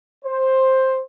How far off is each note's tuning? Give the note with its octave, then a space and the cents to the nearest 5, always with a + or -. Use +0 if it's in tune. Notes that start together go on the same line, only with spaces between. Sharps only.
C5 +10